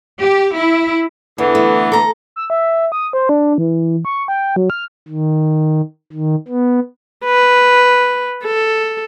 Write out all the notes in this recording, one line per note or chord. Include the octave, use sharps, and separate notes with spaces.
G4
E4
E2 D3 E3 B3
A3
A4 A#5
E6
E5
D#6
C5
D4
E3
C#6
G5
F#3
F6
D#3
D#3
B3
B4
A4